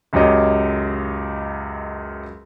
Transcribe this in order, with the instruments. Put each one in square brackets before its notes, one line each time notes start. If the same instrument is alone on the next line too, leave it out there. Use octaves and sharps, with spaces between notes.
[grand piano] C#2 F#2 G4 C#5 D#5